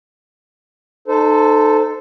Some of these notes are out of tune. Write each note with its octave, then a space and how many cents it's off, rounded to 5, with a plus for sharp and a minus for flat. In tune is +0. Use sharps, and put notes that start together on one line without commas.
D#4 -35 A4 +0 C5 -20